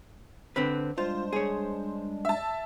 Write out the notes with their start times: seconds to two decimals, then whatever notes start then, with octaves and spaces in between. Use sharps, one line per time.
0.56 D3 C4 B4
0.98 G3 G#3 D4 F4 C5
1.33 G#4 C#5
2.25 E5 A5